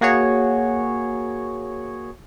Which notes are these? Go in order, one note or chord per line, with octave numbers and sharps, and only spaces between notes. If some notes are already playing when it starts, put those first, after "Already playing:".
A#3 F#4 G#4 C#5